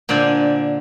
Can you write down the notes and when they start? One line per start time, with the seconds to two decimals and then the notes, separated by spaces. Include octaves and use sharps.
0.09 A#2 D3 C5 D5 G#5